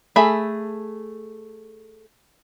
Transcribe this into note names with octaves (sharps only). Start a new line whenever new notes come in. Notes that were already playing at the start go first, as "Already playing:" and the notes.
A3 G#4 E5 B5